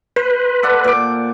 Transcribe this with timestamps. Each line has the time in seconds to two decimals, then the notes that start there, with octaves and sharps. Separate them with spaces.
0.16 B4 C5
0.63 A4 D5 F#5
0.84 A#2 D6